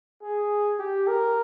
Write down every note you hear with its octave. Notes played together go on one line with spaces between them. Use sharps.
G#4
G4
A#4